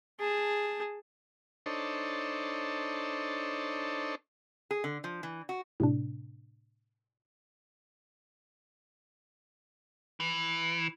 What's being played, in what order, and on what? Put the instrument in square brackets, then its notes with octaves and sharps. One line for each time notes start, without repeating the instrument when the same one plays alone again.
[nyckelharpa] G#4 A5
[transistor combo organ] D4 D#4 A4 C5 C#5
[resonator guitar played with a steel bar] G#4
D3
F3
E3
F#4
[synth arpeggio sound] A2 C3 D4
[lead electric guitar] E3